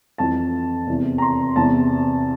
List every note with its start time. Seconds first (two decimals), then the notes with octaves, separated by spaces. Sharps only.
0.18 F2 E3 A5
0.87 E2 C3 E3
1.18 A#5
1.22 C6
1.56 E2 C3 E3 A5